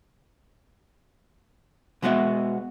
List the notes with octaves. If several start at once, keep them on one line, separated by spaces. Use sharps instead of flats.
B2 G#3 B3 F#4 E5